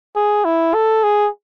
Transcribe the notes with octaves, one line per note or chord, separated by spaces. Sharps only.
G#4
E4
A4
G#4